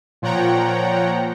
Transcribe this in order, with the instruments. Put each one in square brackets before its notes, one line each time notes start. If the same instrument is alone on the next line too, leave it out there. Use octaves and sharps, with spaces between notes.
[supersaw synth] A#2 F3 C#5 F#5 G5 A#5